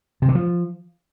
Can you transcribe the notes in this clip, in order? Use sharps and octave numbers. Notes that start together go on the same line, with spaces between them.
C3
D3
F3